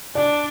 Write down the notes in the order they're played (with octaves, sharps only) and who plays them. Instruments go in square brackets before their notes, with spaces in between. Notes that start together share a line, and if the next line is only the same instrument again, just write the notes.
[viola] D4 [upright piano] D5